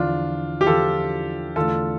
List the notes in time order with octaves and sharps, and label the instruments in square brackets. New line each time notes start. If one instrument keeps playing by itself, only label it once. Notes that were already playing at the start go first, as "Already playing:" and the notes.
Already playing: [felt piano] E2 D3 F3 [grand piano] D4 F4
[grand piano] G4
[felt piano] E2 D3 F3 [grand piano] F4 A4
[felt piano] E2 D3 A3 D4 [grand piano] F4 A4